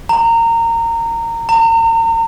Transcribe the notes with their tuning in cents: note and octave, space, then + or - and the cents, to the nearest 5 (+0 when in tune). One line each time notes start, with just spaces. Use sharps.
A#5 -20
A#5 -40